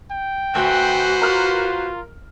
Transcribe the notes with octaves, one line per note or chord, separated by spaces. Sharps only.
G5
D2 F#4 B4 C5 F#5
F4 A#4 F6